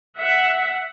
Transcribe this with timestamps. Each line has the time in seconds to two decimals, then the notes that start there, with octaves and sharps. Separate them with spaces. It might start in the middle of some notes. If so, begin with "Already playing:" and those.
0.17 E5 F#5